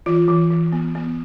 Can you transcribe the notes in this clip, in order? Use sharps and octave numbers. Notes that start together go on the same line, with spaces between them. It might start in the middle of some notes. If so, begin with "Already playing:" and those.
E3 F4
E3
E3
B3
B3